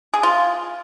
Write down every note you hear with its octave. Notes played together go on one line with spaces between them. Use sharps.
G#4
F4